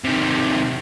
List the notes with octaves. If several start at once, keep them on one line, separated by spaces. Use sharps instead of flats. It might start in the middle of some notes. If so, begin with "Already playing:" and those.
C3 D#3